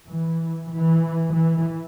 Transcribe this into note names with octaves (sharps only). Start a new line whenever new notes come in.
E3
E3
E3